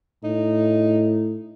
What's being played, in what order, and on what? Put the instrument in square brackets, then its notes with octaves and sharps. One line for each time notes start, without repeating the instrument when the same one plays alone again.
[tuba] A2 [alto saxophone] D#4